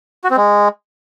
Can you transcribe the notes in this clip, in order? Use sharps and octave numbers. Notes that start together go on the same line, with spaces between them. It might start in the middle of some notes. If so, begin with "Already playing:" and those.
F#4
C4
G#3